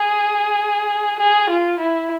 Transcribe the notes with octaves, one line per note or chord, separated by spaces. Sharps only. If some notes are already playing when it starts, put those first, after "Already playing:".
Already playing: G#4
G#4
F4
E4